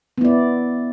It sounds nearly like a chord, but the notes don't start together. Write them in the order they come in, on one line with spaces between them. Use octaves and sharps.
B3 E4 D5